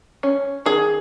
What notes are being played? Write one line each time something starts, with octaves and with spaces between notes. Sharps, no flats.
C#4
D#3 G#4